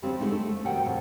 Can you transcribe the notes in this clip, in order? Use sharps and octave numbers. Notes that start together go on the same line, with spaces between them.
F2 C#3 G3 C4 G4
D3 G#3 A3 D#4 E4
A3
F2
F2 B2 D#3 G3 F#5 G5
F2 A#2 C#3 A3